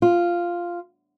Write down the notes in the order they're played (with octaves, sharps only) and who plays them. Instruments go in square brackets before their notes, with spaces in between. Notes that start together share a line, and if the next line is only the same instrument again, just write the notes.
[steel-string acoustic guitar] F4